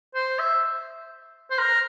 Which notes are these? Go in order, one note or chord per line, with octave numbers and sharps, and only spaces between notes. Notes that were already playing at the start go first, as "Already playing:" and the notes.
C5
E5
C5
A#4